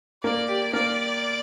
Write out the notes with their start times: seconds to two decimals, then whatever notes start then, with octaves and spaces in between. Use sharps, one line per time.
0.23 A#3 A#4 D5
0.48 G4
0.73 A#3 A#4 D5